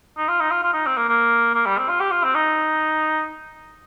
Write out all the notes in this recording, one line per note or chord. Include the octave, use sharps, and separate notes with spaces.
D#4
F4
D#4
F4
F4
D#4
C4
A#3
A#3
A#3
G3
C4
F4
G4
F4
C4
D#4